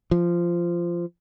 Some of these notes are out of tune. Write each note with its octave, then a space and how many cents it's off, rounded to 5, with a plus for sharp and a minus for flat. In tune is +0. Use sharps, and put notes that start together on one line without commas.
F3 -15